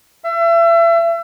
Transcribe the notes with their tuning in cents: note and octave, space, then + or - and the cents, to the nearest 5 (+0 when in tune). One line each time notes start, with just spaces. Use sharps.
E5 +35